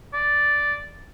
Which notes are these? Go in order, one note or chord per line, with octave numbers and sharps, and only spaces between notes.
D5